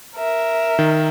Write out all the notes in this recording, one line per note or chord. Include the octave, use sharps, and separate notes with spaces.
A#4 E5
D#3